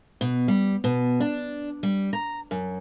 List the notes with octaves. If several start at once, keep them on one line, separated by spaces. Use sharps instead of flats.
B2
G3
B2
D4
G3
A#5
F#2